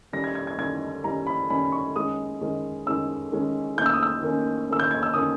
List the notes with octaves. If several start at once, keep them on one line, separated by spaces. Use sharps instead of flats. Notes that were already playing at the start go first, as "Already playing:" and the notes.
D#3 G3 C#4 A#6
G#6
G#6
G#6
D#3 G3 C#4 G#6
D#3 G3 C#4 A#5
B5
D#3 G3 C#4 B5
C#6
D#3 G#3 C#4 D#6
D#3 G#3 C#4
D#3 G#3 C#4 E6
D#3 G#3 C#4
D#3 A#3 C#4 G6
E6
D#6
E6
D#3 A#3 C#4
D#3 A#3 C#4 E6
G6
G#6
E6
D#3 A#3 C#4 D#6